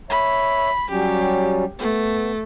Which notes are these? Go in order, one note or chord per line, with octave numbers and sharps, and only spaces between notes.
C#5 E5 B5
F#3 G3 C#4 G4
A3 B3